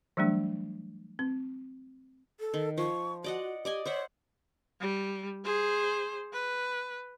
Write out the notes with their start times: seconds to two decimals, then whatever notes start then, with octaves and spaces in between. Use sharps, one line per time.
0.17 E3 F#3 G3 A3 D4
1.19 C4
2.40 A4
2.54 D#3
2.78 F3 C#6
3.24 F#4 D5 D#5 F#5
3.65 G4 D5 D#5 G#5
3.85 C5 C#5 E5 F#5
4.81 G3
5.44 G#4 C5
6.33 B4